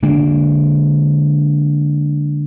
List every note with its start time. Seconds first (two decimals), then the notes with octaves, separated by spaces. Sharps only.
0.03 D3 G#3 A#3 D4